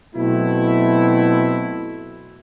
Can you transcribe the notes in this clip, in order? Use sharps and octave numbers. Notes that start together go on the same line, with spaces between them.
B2 F#3 A3 C4 E4